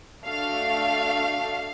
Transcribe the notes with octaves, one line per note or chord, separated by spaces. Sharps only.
A3 D4 F#4 A4 F5